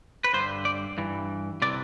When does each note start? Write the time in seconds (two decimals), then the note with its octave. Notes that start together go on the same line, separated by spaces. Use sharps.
0.24 B4
0.33 G2 D3 C5
0.65 D5
0.98 G2 E3
1.62 C3 E3 D5